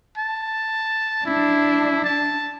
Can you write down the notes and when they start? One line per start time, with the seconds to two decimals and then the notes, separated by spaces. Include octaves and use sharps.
0.18 A5
1.26 D4 E4
2.04 A5